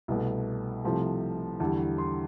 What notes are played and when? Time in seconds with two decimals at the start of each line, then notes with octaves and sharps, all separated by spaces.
0.08 C2 B2 A3
0.84 C2 C3 F3 A3
1.60 E2 D3 G3 A5
1.98 C6